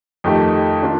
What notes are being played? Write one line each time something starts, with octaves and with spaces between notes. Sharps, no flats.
F2 D#3 A3 D#4 G4
D#3 A#3 D4 F4